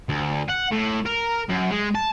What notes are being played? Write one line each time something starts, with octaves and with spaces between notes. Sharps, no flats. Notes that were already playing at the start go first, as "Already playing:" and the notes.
D2
F#5
A2
A#4
F#2
G#3
A5